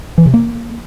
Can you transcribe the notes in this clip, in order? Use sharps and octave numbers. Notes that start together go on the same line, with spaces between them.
E3
C3
A#3